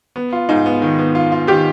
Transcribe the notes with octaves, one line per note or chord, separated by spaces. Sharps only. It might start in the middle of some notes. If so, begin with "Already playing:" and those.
B3
F4
G#2 D#4
B3
D#3
B3
F4
F4
D#3 G4